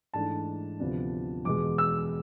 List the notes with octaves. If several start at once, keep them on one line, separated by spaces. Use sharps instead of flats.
G#2 E3 A3 D4 A5
D2 C3 F3 B3 D4
E2 B2 G#3 D6
E6